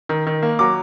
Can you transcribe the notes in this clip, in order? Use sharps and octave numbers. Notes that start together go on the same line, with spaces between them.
D#3
D#3
A#3
F#3 D6